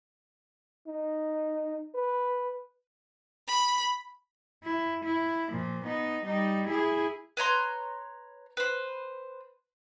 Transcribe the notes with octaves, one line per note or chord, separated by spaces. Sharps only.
D#4
B4
B5
E4
E4
A#2 F3
B3 D#4
G3 D#4
E4 G#4
B4 C#5 A#5 C6
B4 C5